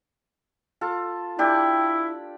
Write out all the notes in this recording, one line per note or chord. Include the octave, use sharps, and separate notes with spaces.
F4 A4
D4 E4 G4 D5